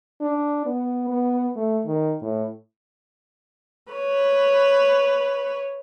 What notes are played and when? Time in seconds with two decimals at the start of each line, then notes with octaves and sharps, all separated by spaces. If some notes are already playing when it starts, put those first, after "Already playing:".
0.21 D4
0.65 B3
1.09 B3
1.56 A3
1.86 D#3
2.21 A2
3.92 B4 C#5